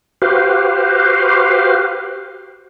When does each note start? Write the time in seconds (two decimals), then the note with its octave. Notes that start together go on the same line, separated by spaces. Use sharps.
0.22 F#4 G4 B4 C5 F5